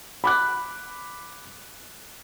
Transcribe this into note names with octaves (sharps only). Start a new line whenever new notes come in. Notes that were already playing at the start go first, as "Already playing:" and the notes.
B5 D6 F#6